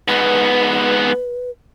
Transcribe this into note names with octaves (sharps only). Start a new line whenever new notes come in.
G#2 B3 B4